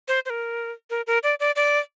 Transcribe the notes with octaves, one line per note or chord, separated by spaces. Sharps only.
C5
C5
A#4
A#4
A#4
D5
D5
D5